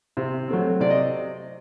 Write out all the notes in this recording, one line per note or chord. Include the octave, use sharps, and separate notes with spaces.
C3
F#3 A3 C4
C3 D5
D#5